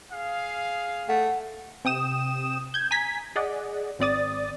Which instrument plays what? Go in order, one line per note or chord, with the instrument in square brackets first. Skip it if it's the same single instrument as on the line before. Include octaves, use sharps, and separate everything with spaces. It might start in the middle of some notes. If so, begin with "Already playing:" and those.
[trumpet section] G#4 F5
[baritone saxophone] A3 [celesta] F#5
[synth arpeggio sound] C3 G5 D#6 E7
G6 G#6
G#5 A#5 G#6 B6
G#4 D5 D#5 F#5
G#1 C4 D5 D#6 A6